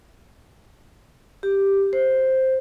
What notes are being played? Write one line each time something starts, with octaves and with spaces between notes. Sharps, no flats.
G4
C5